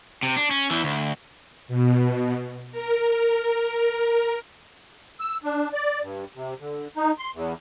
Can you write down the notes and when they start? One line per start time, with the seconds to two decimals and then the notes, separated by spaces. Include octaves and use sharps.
0.23 C3
0.37 D4
0.51 C#4
0.71 E2 E3
0.84 D2
1.68 B2
2.72 A#4
5.20 E6
5.44 D4
5.73 D5
6.02 G2
6.35 C3
6.60 D3
6.96 D#4
7.18 C6
7.34 E2